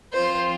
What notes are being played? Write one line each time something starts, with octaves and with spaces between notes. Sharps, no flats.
F3 C4 F4 C5